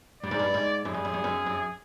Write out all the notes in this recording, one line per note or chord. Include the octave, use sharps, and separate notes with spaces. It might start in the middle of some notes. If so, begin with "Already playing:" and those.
G2 D5
G#2
G2
G#2
F#2 G#4
G2
F#2
G2
F#2
F#2